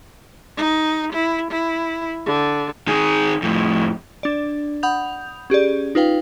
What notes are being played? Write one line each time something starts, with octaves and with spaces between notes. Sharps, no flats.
D#4
E4
E4
D3
D#3 G#4
F2 A2
D4 D5
F#5 B5 D#6 G6 F7
C#4 G4 G#4 D5
D#4 F4 B4 F5 G5